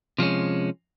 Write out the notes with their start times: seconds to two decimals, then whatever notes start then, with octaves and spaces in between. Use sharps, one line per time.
0.18 C3 F3 G#3 C#4